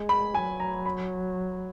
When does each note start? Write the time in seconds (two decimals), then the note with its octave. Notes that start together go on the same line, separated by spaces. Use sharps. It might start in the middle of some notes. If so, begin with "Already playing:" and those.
Already playing: G#3
0.09 B5
0.34 F#3 G#5
0.60 A#5
0.86 B5